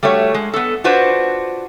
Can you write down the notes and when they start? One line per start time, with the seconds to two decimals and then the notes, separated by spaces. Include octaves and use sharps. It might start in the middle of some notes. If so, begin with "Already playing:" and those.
0.03 G3 A3 F#4 C#5
0.34 G#3
0.54 B3 A4
0.84 D4 F4 F#4 B4 C5